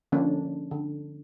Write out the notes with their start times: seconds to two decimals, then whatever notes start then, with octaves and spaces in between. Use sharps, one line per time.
0.12 D3 F3 A#3 C#4 D4
0.71 D3